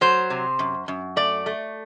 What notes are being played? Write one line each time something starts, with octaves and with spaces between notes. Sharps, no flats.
F#3 C5
C3
F#2
F#2
A3 D5
A3